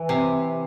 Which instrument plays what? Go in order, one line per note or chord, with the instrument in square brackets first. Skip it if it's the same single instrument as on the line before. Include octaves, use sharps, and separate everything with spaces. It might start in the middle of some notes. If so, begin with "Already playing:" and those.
Already playing: [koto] E3
C3